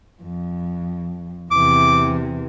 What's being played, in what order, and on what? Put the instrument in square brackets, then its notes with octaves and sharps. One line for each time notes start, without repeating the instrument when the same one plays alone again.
[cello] F2
[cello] E2 C3 [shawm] D6